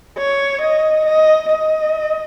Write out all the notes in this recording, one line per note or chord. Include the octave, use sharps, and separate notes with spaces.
C#5
D#5
D#5
D#5